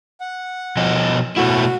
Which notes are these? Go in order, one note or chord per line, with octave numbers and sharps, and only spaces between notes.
F#5
B2 F3 D#5
B2 A3 E4 F#4